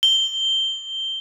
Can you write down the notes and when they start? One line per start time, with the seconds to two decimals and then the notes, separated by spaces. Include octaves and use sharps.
0.03 G7